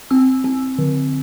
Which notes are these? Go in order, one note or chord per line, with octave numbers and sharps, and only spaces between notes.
C4 E6
C4
D3